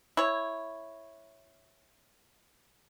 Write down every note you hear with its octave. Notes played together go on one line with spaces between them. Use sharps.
E4 C#5